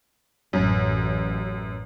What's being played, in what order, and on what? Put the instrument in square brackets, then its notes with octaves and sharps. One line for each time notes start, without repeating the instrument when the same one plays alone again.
[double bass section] A1 [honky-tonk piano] F#2